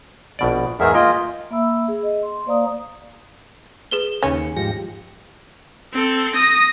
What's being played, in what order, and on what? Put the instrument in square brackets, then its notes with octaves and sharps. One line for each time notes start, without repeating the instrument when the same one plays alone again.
[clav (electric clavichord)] A#1 B2 D5
[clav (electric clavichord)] E2 G#2 D#3 [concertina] G#4 A#4 E5
[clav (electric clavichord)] A#3 G5 [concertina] F4 D#5
[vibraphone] A#3 E5 B5 E6
G#4
D#5
C6
A#3 C5 D5 F5 A#5 D#6
[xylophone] G#4 B4 G7
[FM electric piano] D#2 C#3 C#7 [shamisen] C#4
[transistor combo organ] G#2 F3 G4 [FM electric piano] A#6 C#7
[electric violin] C4 A4
D#6 A#6